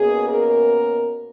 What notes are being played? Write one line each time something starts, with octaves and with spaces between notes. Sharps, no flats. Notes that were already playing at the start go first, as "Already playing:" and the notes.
Already playing: B2 A#3 C#4 G#4
A#4